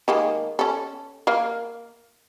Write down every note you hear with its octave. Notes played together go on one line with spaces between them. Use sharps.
D#3 G#3 A#3
C#4 A4
A#3 A#4 F5